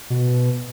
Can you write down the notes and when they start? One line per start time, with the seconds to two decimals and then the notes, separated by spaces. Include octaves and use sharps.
0.10 B2